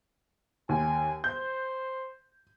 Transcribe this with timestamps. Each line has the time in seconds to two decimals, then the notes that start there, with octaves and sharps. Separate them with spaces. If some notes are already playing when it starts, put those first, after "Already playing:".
0.69 D#2 G#5
1.24 C5 G6